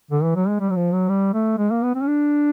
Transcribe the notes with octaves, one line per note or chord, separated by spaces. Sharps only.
D3
E3
F#3
G#3
G3
F#3
F3
F#3
G3
A3
G#3
A#3
B3
C4
C#4
D4